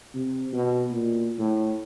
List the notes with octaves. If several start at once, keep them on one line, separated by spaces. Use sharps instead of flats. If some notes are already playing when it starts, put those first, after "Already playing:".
C3
B2
A#2
A2